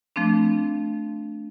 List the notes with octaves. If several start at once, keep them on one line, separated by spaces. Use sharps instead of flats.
F3 A3 C4 D4